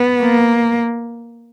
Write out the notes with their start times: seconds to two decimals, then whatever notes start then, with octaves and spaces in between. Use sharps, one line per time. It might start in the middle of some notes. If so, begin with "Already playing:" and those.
Already playing: B3
0.20 A#3